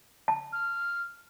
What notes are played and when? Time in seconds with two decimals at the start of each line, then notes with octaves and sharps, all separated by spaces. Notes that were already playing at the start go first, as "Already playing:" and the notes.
0.28 A5
0.53 F6